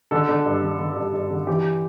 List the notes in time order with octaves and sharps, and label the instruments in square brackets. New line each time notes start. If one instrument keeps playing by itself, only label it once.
[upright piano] D3 A4
D3
G2
D3
D3
G2
G2
D3
E3 G4